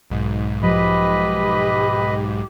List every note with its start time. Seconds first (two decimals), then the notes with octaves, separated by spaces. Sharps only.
0.10 B1 G#2
0.63 F3 G4 B4 D#5 B5